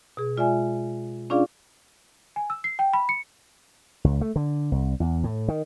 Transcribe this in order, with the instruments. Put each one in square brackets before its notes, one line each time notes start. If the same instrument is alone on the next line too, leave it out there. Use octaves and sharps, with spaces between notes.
[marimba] B2 G#4
G#3 F4 D5 E5 G#5
C#4 D4 F4 G#4 D5 F5
[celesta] G#5
E6
C7
G5
B5
C#7
[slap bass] C#2
A3
D3
C2
E2
A2
D#3